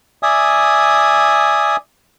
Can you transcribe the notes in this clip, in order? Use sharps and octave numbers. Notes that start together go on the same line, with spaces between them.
D5 E5 G#5 D#6